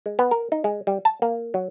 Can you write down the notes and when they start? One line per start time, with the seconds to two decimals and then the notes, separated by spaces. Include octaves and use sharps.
0.06 G#3
0.19 B3
0.31 A#4
0.52 D#4
0.64 G#3
0.87 G3
1.05 A5
1.22 A#3
1.54 F#3